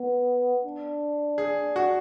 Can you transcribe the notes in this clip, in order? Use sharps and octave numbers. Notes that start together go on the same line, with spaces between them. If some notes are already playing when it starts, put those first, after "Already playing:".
Already playing: B3
D4
G#4
F#4